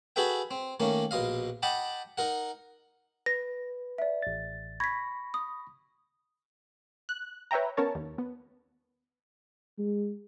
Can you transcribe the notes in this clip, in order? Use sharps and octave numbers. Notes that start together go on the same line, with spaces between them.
F#4 G#4 A4 B4 E5 G5
C4
D#3 A3 A#3 C#4
A#1 B2 D#5 F5
D#5 F#5 G5 A5 B5 D6
D#4 A#4 F#5
B4 A#6
D5 E5
A1 A6
B5 C#6 G#6 A#6 B6
D#6
F#6
B4 C#5 E5 G5 A#5
B3 C#4 A#4 C#5 A5
D#2
B3
G#3